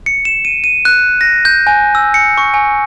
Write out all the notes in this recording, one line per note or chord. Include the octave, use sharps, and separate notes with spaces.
C#7
E7
D#7
D#7
F#6
A#6
G6
G#5
E6
C#7
C#6
G#5